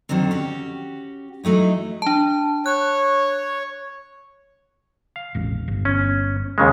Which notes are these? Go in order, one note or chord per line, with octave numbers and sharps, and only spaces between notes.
F2 D3 D#3 F#3 C4
C#4 F#4 G4
E3 F#3 A3 D#4 E4
D4 A5
C#5 F#6
F5
E1 A1
G1
C#4
D#2 C#3 G#3